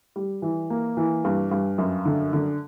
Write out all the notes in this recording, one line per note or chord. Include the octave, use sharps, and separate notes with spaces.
G3
E3
A#3
E3
G2
G2
F#2
D3
D3